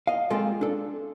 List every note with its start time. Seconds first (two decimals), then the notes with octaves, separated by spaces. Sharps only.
0.07 D#5 F5
0.30 G#3 A#3 C4 F4 A4 C5
0.61 D4 A4